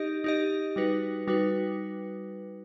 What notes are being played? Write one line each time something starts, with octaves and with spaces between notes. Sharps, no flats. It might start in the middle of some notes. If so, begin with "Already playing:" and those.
Already playing: D#4 G4 D#5
D#4 G4 D#5
G3 D#4 F#4 B4
G3 D#4 F#4 B4